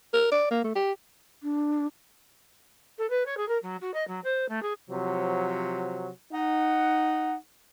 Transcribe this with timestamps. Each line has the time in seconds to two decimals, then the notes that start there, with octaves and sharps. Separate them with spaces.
0.13 A#4
0.31 D5
0.51 A#3
0.64 A3
0.75 G4
1.43 D4
2.98 A4
3.10 B4
3.26 C#5
3.37 G#4
3.48 A#4
3.62 F#3
3.81 F#4
3.94 D#5
4.07 F#3
4.24 C5
4.48 A3
4.62 G#4
4.90 C3 F3 F#3
6.32 D#4 F#5